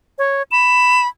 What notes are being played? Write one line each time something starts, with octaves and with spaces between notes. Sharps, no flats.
C#5
B5 E7